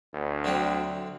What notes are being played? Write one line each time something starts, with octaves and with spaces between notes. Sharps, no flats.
D2
D3 F#3 C4